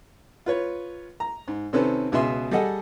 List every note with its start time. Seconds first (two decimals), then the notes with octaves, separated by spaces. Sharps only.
0.46 F4 B4 C#5
1.20 A#5
1.48 G#2
1.73 C3 D#3 C4 C#4 A4 B4
2.12 C#2 B2 G#4 B4 E5 C6
2.51 G3 G#4 A4 D#5 F#5